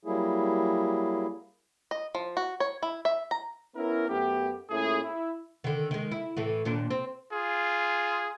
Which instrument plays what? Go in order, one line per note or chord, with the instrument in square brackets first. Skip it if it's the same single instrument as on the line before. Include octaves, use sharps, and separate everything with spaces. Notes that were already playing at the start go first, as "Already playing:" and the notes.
[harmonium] F#3 G3 A#3 E4 G#4
[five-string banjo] D#5
F3
F#4
C#5
E4
E5
A#5
[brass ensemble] B3 C#4 E4 A#4
F#2 A3 B3 G4
A#2 A3 C#4 E4 G#4
E4
[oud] D3 D#3
D#3 G#3
E4
A2 E3 A3
D#2 A#2 D4
C4
[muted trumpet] F4 [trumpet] G#4